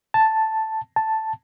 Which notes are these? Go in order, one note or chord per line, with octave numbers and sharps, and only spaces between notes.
A5
A5